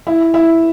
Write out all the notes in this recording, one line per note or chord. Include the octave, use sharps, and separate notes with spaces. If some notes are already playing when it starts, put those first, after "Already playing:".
E4
E4